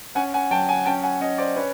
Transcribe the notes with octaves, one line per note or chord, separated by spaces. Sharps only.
C#4 F#5 G#5
F#5 G#5
F#3 G5 A5
F#5 G#5
C#4 G5 A5
F#5 G#5
C#4 C#5 D#5
C5 D5
C#4 B4 C#5